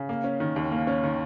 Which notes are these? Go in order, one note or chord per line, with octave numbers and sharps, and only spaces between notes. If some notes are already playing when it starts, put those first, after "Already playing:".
Already playing: C#3
A#3
C#4
D#3
D#2
A#3
C#4
D#3